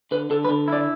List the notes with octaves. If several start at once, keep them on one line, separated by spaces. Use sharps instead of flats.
D3 B4
D3 A4
B4
D3
E4 D5